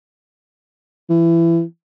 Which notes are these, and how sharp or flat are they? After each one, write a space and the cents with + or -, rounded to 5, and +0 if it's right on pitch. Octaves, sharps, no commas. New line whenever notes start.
E3 +25